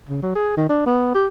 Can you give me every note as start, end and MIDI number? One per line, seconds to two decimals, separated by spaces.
0.09 0.22 49
0.22 0.31 54
0.35 0.55 68
0.57 0.68 51
0.69 0.82 62
0.86 1.10 59
1.14 1.27 67